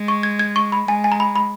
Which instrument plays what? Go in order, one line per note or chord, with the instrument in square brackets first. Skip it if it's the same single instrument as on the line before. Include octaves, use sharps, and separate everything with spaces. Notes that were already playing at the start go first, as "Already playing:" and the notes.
Already playing: [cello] G#3
[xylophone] C#6
G#6
G#6
C#6
B5
[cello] G#3 [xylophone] G#5
[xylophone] G#5
A#5
B5
B5